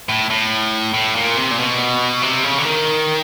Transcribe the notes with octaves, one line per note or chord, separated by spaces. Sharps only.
A2
A2
A2
A#2
C3
A#2
B2
C3
C#3
D3
D#3